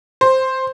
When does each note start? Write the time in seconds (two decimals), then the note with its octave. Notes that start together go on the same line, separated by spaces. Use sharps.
0.21 C5